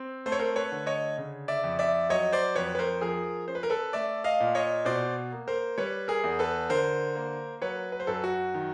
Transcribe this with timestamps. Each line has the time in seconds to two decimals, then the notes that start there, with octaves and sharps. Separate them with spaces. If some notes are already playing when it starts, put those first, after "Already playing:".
Already playing: C4
0.26 A3 C5
0.32 C#5
0.39 A#4 C5
0.56 B4 C#5
0.72 D3
0.86 C#5 D#5
1.18 C#3
1.48 D5 E5
1.64 F2
1.79 D5 E5
2.09 F#3 C#5 D#5
2.32 C5 D5
2.55 F2 B4 C#5
2.75 B4
2.79 A#4 C5
3.01 F3 G#4 A#4
3.48 C#4 C5
3.55 B4
3.63 A#4
3.70 A4 B4
3.93 A3 D5 E5
4.24 D#5 F5
4.40 A#2
4.55 C#5 D#5
4.85 B2 C5 D5
5.32 A#3
5.48 A#4 C5
5.78 G3 B4 C#5
6.08 G#4 A#4
6.24 E2
6.39 A4 B4
6.70 D3 A#4 C5
7.15 A#3
7.62 F#3 B4 C#5
7.92 B4
8.00 C5
8.07 F#2 A4 B4
8.24 F#4
8.54 D#3